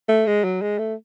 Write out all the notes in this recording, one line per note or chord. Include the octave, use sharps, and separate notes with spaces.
A3
G#3
F#3
G#3
A3